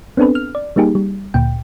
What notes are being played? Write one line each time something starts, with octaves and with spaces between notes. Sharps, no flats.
B3 C4 D4 A4 B4
F6
D5
G3 A#3 D#4 G4 G#4
G3
D2 A#2 G5